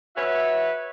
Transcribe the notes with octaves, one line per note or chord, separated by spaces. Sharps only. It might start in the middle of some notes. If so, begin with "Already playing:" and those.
F#4 B4 C#5 E5